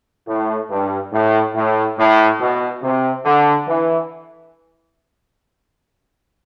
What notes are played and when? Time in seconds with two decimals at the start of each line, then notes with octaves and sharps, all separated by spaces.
0.28 A2
0.70 G2
1.13 A2
1.55 A2
1.97 A2
2.40 B2
2.82 C3
3.25 D3
3.67 E3